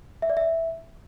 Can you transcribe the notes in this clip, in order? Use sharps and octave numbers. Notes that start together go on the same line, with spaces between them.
E5
D5
E5